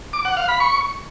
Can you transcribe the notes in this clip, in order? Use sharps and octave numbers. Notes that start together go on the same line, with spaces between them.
D6
F#5
F5
B5
C#6